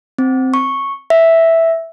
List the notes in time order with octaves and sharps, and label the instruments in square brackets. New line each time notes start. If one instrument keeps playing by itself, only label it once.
[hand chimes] C4
C#6
E5